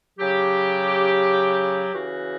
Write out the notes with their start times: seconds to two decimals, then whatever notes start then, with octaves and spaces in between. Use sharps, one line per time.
0.19 C#3 F#3 G4
1.94 C#3 E3 F#4